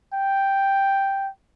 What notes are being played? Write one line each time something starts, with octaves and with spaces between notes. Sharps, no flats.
G5